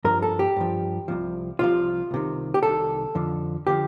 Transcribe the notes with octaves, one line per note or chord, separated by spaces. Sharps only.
G2 F3 A#4
A4
G4
G2 F3
C2 C3 F3
C2 C3 F3 F4
C2 C3 D#3
G4
C2 C3 D#3 A4
F2 D3 F3
D3 F3 G4